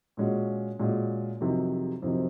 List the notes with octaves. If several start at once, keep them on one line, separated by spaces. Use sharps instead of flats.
A#2 G#3 C#4 F#4
A#2 G#3 C#4 F#4
F2 C3 D#3 F#3
F2 C3 D#3 F#3